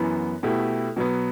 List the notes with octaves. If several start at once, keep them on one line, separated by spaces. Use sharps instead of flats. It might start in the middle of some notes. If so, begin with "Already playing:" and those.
Already playing: F#2 E3 B3
B2 A3 E4 G4
B2 F#3 B3